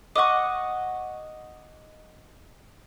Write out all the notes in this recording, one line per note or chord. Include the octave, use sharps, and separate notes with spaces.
D#5 F#5 C#6 D6